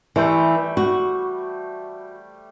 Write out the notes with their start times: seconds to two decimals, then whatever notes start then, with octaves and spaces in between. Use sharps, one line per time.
0.16 E3 G3 A3 C5
0.77 F#4